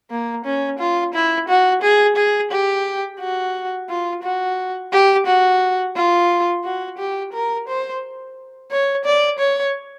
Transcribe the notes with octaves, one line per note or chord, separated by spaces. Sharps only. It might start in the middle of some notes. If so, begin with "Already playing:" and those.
A#3
C#4
F4
E4
F#4
G#4
G#4
G4
F#4
F4
F#4
G4
F#4
F4
F#4
G4
A#4
C5
C#5
D5
C#5